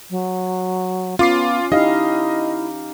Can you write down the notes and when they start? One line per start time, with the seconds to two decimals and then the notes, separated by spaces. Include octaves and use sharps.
0.10 F#3
1.19 B3 C#4 F4 D6 C7
1.72 D#4 E4 G4 D#5 F5